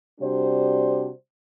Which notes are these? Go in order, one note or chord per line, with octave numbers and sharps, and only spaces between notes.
C3 G3 D4 F#4 C5